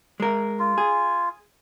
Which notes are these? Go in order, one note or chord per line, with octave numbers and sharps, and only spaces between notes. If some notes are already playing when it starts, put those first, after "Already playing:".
G#3 A#4
F4
G#4